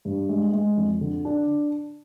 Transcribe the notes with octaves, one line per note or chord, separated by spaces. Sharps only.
G2
G#3
G#3
F2
D3
D4